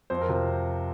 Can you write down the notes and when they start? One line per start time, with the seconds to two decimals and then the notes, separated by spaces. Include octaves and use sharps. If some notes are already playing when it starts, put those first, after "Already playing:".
0.10 F2 C5
0.21 A#4
0.29 C3 F3